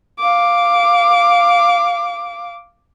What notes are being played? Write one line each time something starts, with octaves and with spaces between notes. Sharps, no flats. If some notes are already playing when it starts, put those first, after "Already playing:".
F5 D6